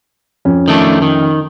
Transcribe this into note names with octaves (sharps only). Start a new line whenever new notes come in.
F2 C#4
D#3 A3 D4
D#3